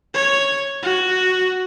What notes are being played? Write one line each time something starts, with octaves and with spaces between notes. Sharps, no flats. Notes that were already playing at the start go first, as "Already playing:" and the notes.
C#5
F#4